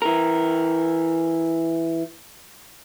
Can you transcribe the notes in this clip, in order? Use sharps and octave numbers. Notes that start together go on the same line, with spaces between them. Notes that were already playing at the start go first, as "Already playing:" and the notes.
E3 A#4